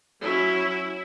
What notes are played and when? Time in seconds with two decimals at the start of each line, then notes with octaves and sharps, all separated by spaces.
0.21 F#3 C#4 E4